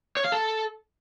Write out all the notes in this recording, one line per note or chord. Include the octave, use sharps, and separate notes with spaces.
C#5
F5
A4